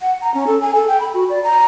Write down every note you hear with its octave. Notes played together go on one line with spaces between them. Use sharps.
F#5
A#5
C#4
A4
G#5
A4
G5
B5
F#4
D5
A#5